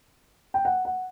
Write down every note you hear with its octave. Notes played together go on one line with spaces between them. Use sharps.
G5
F#5
F#5